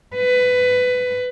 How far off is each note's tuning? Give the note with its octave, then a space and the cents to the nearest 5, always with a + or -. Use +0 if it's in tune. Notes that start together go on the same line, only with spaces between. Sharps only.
B4 +15